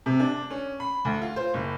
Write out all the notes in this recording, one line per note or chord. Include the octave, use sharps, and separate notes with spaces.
C3
D4
C#4
B5
D2
F4
C5
F#1